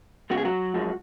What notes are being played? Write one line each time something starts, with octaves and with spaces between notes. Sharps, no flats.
C#3 G#3 B3 F#4
G#4
F#3 F#4
F#2 F3 G#3